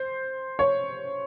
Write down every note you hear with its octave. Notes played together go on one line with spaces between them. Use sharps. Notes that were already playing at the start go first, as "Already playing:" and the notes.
Already playing: C5
C#5